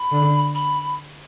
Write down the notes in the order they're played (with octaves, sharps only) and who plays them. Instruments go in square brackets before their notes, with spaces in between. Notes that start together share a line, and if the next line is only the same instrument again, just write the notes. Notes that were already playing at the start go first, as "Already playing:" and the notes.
Already playing: [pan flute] B5
[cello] D3
[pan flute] B5